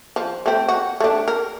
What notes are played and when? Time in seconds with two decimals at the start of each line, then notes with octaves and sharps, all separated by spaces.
0.16 F3
0.46 A3 C4
0.68 F#4
1.00 A3 D4
1.28 A#4